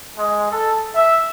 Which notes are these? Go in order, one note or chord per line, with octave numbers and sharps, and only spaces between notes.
G#3
A4
E5